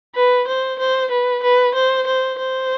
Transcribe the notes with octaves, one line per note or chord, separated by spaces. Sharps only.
B4
C5
C5
B4
B4
C5
C5
C5